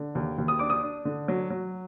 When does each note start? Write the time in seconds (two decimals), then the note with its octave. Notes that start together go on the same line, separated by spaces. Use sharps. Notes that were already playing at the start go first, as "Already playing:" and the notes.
Already playing: D3
0.15 D#2
0.38 D#2
0.48 D#6
0.59 D4 D6
0.70 D#6
0.83 D4
1.05 D3
1.28 F#3
1.50 F#3